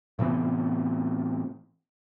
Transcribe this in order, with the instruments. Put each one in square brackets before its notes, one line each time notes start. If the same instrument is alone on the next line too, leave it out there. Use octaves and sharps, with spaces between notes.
[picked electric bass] A2 C3 E3 B3